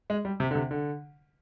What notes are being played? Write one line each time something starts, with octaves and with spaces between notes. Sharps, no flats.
G#3
G3
C3
D3
C3
D3